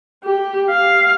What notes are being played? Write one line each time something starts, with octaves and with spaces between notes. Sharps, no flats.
G4
F5